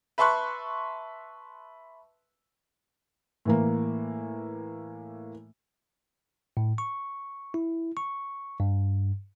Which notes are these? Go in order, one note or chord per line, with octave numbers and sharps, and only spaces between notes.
B4 E5 A5 C6 C#6 F#6
A2 E3 A#3
A2
C#6
E4
C#6
G2